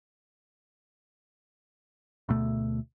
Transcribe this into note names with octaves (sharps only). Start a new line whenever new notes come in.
D2 B2 A3